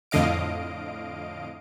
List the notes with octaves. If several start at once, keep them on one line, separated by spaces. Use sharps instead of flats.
F2 A2 D3 D#5 F5 D7